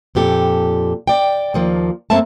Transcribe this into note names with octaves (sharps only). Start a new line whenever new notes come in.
F2 A#2 G4 A4
D5 G5
D#2 F3 A#3
F#2 A3 A#3 C4 E5 A5